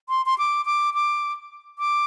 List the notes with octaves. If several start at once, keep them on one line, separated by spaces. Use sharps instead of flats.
C6
C6
D6
D6
D6
D6